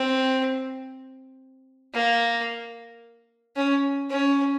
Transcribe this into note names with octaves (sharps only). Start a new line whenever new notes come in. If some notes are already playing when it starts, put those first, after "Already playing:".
Already playing: C4
A#3
C#4
C#4